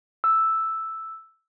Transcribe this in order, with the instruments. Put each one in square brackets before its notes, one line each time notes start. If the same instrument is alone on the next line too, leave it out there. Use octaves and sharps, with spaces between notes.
[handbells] E6